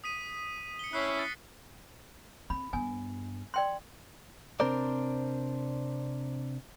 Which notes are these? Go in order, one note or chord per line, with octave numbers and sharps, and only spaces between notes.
D#6 B6 D#7
C#7 G7
C#4 E4 C#5 F#6 B6 C7
A6 C#7
C4 B5
G2 B3 G#5
D5 G5 C6
C3 C4 D4 A#4 C5 D5